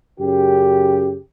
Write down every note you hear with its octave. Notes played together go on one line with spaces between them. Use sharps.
F#2 C#3 G4